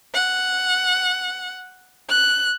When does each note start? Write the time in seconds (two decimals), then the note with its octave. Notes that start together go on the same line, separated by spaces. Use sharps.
0.14 F#5
2.10 F#6